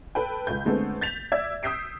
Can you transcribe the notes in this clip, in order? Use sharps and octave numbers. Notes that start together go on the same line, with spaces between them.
A4 B4 G5
C#2 B4 G6
D3 G#3 A3 B3 C4
G6 A6 B6 F7
D5 E5 E6 G#6
D#6 E6 G6 B6 C7 D7